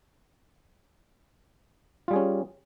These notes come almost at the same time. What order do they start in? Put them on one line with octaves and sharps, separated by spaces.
F4 G3 G#4 C#4